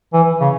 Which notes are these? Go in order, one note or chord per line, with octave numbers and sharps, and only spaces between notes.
E3
C#3